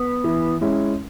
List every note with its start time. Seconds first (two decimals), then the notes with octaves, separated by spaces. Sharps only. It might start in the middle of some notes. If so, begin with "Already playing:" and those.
Already playing: B3
0.24 E3
0.61 G#3 C#4 E4